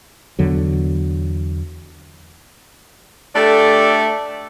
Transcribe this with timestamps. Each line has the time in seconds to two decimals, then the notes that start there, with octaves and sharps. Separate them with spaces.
0.39 E2 D3 F#3
3.35 A3 D4 G4 A4 D5